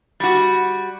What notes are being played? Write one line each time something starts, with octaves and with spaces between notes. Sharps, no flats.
G3 F#4